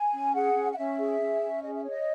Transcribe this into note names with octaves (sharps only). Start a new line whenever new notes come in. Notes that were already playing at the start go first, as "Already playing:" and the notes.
Already playing: G#5
C#4
G#4 F#5
C#4
F#5
C#4 E5
G#4
C#4
C#4
G#4 D#5
E5
C#5 D#5